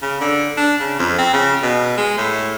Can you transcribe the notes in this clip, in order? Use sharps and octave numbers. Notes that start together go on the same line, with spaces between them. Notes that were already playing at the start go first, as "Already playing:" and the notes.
C#3
D3
D4
C#3
F2
C4
C#3
B2
G#3
A2